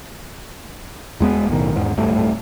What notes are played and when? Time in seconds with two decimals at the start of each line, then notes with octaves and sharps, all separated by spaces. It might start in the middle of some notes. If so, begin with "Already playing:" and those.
1.20 E2 G#3 B3
1.48 B1 A2 D#3
1.76 E2 G#2
1.97 D1 G2 A3